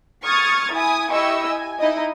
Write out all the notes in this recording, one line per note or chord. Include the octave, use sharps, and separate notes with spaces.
C#6 D#6 F6 G#6 A6
E4 G#5 D#6
E4 G4 D#5 C#6 E6
G#5
D#4 E4 D#5